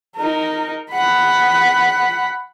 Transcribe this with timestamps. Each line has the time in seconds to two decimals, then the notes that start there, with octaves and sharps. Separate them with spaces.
0.16 D#4 A#4
0.91 F#5 B5